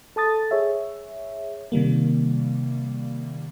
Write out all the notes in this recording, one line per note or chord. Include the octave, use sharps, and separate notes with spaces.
A4 A5 D#6 A6
G#4 C#5 E5
C3 D#3 G3 A#3